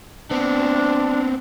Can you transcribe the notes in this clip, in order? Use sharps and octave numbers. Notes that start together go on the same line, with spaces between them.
B3 C4 D4